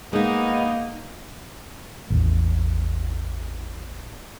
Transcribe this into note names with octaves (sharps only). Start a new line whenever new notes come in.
G#3 A#3 B3 D#4
A1 E2